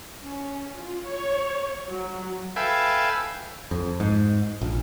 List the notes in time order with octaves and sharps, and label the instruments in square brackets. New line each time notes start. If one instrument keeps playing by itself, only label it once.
[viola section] C#4
F4
C#5
F#3
[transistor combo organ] A4 B4 E5 F5 G5 G#5
[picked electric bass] F2
G#2
A#1